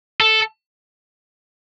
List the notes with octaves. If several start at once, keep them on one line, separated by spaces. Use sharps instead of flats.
A4